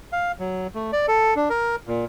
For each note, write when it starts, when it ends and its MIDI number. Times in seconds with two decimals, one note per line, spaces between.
0.12 0.32 77
0.39 0.67 54
0.75 0.91 57
0.93 1.06 74
1.08 1.34 69
1.36 1.49 62
1.50 1.76 70
1.87 2.05 46